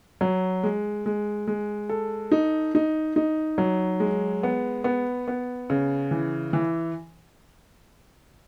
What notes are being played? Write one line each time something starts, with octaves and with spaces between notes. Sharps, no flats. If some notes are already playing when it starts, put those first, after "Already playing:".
F#3
G#3
G#3
G#3
A4
D#4
D#4
D#4
F#3
G#3
B3
B3
B3
C#3
E3
E3